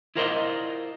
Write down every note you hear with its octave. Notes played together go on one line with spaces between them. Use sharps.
E4 F4 A#4 C5 D5 D#5